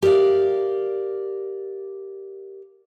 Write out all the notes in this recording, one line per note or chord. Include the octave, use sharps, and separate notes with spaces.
G4 A#4 C5 D5 F5